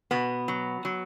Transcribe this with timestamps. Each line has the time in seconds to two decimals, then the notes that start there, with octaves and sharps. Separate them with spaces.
0.11 B2 B3
0.48 F#3
0.85 F#3